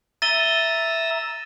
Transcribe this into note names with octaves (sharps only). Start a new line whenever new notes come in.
E5 A#5 E6 A6 D#7 G7